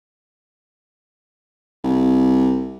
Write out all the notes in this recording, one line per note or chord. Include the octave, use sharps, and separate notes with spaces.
C2